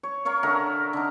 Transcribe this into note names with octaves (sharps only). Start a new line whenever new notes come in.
C#5
A#4 C#5 F5 C#6
D3 A#4 E5
D3 D#4